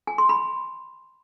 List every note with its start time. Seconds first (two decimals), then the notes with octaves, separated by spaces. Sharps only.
0.07 G#5
0.18 C6
0.29 B5